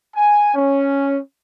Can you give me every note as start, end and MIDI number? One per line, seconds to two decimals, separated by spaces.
0.15 0.51 80
0.55 1.19 61